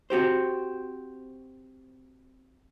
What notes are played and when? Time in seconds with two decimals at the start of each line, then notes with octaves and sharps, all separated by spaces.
0.10 C4 F#4 G4 C5